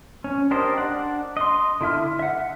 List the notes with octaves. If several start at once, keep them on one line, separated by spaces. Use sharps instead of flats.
C#4
D4 G4 A#4 C5 D#5
D4 F#5
D#5 C6
D3 E4 E5 F6
E5 F#5